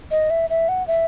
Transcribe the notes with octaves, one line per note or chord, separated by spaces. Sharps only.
D#5
E5
E5
F#5
E5